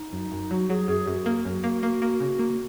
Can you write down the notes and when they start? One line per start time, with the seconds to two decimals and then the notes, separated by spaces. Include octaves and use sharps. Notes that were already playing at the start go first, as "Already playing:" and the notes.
Already playing: D#4
0.13 F#2
0.32 F#2
0.51 F#3 F#4
0.70 F#3 G#4
0.88 F#2 G#4
1.07 F#2 F#4
1.26 A#3
1.45 F#2
1.64 A#3
1.83 A#3
2.02 A#3
2.21 C#3
2.39 A#3